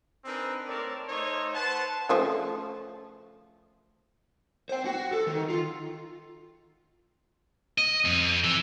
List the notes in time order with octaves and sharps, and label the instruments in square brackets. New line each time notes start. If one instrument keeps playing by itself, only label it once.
[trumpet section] C4 D4 D#4 G#4 A#4 B4
A3 C4 A#4 C#5 D5 A5
A3 D#4 C5 C#5
B4 C5 F#5 A5
[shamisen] C#3 F3 A3
[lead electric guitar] C5 G5
F#4
A4
D#3
F4
[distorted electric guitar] D#5
F2
E3